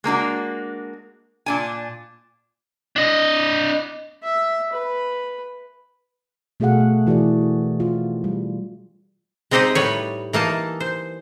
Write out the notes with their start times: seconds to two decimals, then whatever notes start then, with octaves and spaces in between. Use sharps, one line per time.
0.04 G#3 A#3 D4 F#4
1.46 A#2 D4 G#5
2.96 D4 D#5
4.23 E5
4.73 B4
6.60 B2 A3 F#4 G#4 F5 F#5
6.80 A3
7.07 E3 F#4 G#4 A#4 D5
7.80 F4
8.24 G3
9.51 G#3 C4 D#4 G4 C5 D#5
9.75 A2 G3 B4 C#5
10.33 E3 A#3 D#4 A5
10.80 C5